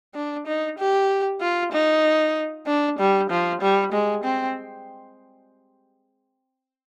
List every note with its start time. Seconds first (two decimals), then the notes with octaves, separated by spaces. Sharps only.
0.15 D4
0.47 D#4
0.79 G4
1.41 F4
1.72 D#4
2.67 D4
2.99 G3
3.30 F3
3.62 G3
3.93 G#3
4.24 C4